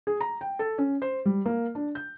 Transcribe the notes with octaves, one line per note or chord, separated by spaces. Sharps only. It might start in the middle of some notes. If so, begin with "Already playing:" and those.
G#4
A#5
G5
A4
C#4
C5
G3
A#3
D4
G6